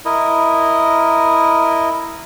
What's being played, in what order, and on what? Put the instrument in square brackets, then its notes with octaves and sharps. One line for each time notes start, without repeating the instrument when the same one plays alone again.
[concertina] E4 A#4 D#5